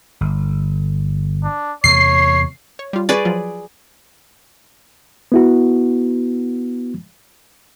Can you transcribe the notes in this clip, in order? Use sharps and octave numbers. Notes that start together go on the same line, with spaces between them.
G1
D4
E2 C3 A3 C#5 C7
C#5
G3 F4
G#4 B4 D5 C#6 A6
F3 F#3 F4
B3 E4 F#4